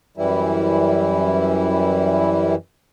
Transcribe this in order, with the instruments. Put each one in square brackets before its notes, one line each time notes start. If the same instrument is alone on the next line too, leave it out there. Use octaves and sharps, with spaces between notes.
[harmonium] F#2 E3 G3 E4